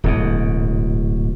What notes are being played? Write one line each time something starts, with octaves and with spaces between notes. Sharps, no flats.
D1 G#2 B2